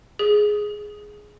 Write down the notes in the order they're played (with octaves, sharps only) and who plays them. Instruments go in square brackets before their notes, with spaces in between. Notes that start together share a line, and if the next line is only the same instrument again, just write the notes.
[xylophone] G#4